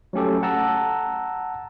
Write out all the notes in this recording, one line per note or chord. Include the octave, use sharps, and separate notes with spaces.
F#3 A3 C#4 G4 A4
F#5 A5 A#5 E6